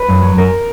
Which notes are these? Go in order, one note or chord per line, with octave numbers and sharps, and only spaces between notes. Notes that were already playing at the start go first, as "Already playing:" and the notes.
Already playing: B4
F#2
F#3
F#2 A#4